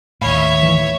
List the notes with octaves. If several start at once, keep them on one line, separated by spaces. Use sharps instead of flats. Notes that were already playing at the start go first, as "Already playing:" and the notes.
D#2 A2 C#5 E5 F5 B5
E3